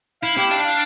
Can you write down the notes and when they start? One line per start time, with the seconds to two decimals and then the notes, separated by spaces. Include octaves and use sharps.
0.22 E4 F5
0.37 E4 G4
0.50 D4 F5
0.65 F5